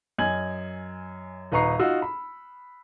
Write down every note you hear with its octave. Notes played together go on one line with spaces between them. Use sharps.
F#2 D#5 G#5 G#6 F#7
D#1 B4 D#5 A#5 C#6 C7
D#4 F4 F#4 E6
B5